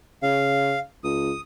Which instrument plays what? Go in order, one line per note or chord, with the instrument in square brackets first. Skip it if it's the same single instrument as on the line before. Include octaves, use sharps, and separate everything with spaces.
[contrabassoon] C#3 [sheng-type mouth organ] F5
[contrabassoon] C#2 [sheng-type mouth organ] D#6